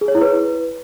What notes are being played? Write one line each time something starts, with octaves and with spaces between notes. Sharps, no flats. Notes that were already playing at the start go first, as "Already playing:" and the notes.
G#4
C#5
E4
B4